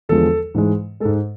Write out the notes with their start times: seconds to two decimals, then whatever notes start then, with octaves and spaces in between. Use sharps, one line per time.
0.09 E2 D3 F3 G#3 A4
0.54 G#2 E3 G#3
1.00 G#3 A4
1.05 G#2